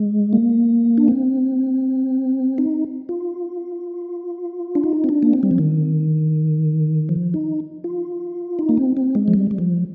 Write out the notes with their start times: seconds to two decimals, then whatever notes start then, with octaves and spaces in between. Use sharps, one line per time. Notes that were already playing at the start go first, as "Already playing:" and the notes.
Already playing: G#3
0.33 A#3
0.98 D4
1.08 C4
2.58 D#4
3.09 F4
4.75 D4
4.84 D#4
5.04 C4
5.09 D4
5.23 A#3
5.33 C4
5.43 G3
5.51 F3
5.58 D#3
7.09 F3
7.34 D#4
7.84 F4
8.59 D#4
8.69 A#3
8.77 C4
8.97 C4
9.15 G#3
9.28 F3
9.34 G3
9.51 G3
9.58 F3